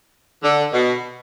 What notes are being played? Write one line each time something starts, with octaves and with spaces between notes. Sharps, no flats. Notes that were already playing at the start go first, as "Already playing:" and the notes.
D3
B2